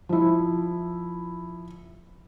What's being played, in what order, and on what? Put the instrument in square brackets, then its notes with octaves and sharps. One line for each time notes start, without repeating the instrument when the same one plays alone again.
[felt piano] F3 E4